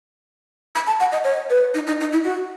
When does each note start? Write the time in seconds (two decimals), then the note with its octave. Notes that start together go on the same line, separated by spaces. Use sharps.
0.75 B5
0.87 A5
1.00 F#5
1.12 D#5
1.24 C#5
1.50 B4
1.74 D#4
1.87 D#4
2.01 D#4
2.12 E4
2.24 F#4